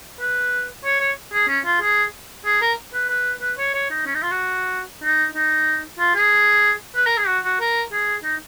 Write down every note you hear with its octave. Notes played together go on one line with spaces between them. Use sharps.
B4
C#5
C#5
G#4
C#4
F4
G#4
G#4
A#4
B4
B4
B4
C#5
C#5
D#4
C#4
D#4
F4
F#4
D#4
D#4
F4
G#4
B4
A#4
G#4
F#4
F#4
A#4
G#4
D#4